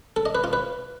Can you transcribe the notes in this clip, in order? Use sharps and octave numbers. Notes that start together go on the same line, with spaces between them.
A4
D#5
B4
F4
B4